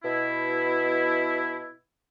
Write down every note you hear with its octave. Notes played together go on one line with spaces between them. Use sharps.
B2 E4